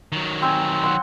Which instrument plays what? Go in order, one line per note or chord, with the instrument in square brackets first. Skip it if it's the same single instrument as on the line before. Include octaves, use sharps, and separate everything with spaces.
[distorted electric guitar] D#3 F#3
[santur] C4 C5 G#5
F#5 C6